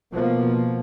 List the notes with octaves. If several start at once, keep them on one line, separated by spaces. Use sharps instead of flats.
B2 F3 A#3